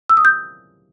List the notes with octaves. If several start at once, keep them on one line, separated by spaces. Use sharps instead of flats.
E6
D#6
G6